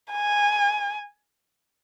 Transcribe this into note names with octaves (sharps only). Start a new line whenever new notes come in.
G#5